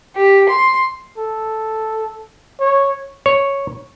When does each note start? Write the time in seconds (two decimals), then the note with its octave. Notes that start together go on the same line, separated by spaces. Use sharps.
0.16 G4
0.49 C6
1.18 A4
2.60 C#5
3.26 C#5